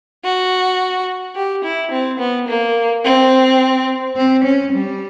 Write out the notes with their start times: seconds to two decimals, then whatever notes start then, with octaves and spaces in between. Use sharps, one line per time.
0.24 F#4
1.35 G4
1.64 E4
1.91 C4
2.19 B3
2.48 A#3
3.04 C4
4.16 C4
4.45 C#4
4.73 G3